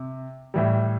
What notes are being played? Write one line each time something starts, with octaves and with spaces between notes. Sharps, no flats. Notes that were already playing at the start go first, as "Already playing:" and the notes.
Already playing: C3
A2 E3 G3